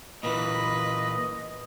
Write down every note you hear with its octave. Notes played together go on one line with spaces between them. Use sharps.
A#2 E3 B4 D#5